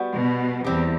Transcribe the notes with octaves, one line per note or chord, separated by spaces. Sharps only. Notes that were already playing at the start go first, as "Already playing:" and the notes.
Already playing: G3 B3 F#4
B2
E2 G3 C4 G4